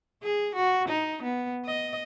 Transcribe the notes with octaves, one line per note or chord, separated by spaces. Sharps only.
G#4
F#4
D#4
B3
D#5